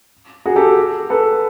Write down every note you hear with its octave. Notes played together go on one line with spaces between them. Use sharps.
F#4 G#4
G4 A4
A4 B4